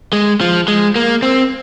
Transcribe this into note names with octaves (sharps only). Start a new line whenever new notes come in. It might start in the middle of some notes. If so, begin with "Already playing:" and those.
G#3
F3
G#3
A#3
C4